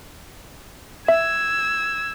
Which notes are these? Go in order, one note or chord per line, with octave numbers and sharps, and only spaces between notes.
E5 E6 G#6